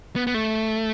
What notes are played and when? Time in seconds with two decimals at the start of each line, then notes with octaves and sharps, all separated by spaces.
0.16 B3
0.27 B3
0.34 A3